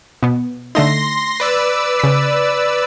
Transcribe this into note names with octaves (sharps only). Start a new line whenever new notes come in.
B2 B3
D3 A3 D#4 C6 A#6
B4 D5 E6
C#3 B6